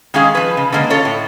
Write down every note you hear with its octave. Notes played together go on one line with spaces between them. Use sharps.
D#3 G#3 C#4 G#4 F5
F3 B4
C#3
D3 G#3 A#3 C#4 D4
C#4 F4 A4 C#5
A2